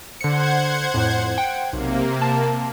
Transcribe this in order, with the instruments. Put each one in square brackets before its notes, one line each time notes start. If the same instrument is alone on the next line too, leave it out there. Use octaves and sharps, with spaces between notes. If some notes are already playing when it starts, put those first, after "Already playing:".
[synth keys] D3 C#7 [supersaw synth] C5 F#5 G#6
[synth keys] F2 A2
F#5 G5
[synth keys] B1 [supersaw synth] C3 A#3
[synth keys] A5